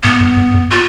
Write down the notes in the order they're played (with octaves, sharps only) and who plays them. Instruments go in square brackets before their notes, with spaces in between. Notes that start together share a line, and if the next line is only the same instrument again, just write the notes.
[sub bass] G#2 [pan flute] B3
[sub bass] G2
G2
F#2
[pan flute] F4